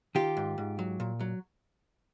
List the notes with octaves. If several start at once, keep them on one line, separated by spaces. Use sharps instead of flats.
D#3 F4 G4
G#2
G#2
F#3
A#2
F#3